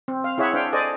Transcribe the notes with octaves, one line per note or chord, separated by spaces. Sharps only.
C4
F5
E4 G#4 C#5 E5 F#5
D4 C5 F5 G5
A4 C5 D5 D#5 G#5